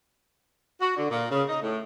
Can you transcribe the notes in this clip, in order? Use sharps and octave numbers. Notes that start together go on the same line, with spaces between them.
F#4
D3
A#2
C#3
D#4
A2